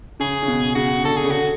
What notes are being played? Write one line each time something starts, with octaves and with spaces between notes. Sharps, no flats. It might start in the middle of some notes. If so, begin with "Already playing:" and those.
C#3 G#4
C#3
B2
C#3 F#4
D3 A4
G#4
C#3
D3 F#4